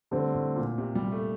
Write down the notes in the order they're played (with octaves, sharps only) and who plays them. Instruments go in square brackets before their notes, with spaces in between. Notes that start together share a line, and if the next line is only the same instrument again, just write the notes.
[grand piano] A2 [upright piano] D3 G3 C4
[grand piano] A2
A#2
C3
G3
A3